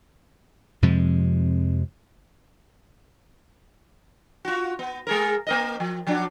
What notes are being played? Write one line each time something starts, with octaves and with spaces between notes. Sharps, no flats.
F2 C3 F3 G#3
F4 F#4
B3
G#3 G#4 A#4
A#3 A#4 D#5
F3
F3 F#3 D4